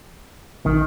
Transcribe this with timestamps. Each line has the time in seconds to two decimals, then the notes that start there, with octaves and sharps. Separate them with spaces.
0.66 A#1 D#3